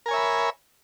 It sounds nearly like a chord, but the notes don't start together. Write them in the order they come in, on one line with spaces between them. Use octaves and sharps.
A#4 G#5 C#5 E5 B5